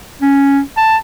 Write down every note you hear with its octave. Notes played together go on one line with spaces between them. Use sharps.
C#4
A5